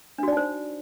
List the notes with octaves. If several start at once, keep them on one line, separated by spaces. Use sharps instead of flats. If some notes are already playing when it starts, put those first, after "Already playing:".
D4 D#4 F#4 C5 D5